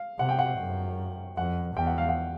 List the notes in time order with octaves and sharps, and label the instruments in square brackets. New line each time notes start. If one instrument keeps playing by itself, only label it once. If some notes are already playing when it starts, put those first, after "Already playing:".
Already playing: [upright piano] F5
[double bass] C3 [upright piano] F#5
[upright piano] G5
F#5
[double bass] F#2
[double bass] F2 [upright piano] F#5
[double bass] E2 [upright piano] G5
[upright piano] F#5
F5
F#5